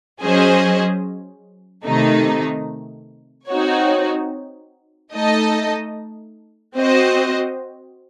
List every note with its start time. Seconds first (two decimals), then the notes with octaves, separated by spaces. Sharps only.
0.22 F#3 C#4 G#4 C5 D#5
1.85 C3 D#3 A3 D#4
3.49 C4 D#4 F#4 C#5
5.12 A3 D#4 A4 D#5
6.76 C4 F#4 C5 D#5